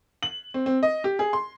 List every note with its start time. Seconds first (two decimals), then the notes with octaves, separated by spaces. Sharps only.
0.23 F#7
0.54 C4
0.66 C4
0.83 D#5
1.04 G4
1.19 G#4
1.33 C6